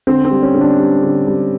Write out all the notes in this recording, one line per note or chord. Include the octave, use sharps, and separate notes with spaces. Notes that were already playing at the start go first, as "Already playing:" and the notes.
D3 C4
C4
G3
C#4
D3
D4
G3
D3
G3